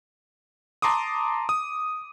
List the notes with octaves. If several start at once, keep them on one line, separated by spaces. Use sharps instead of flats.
A5 A#5 C6 D6 D#6
D#6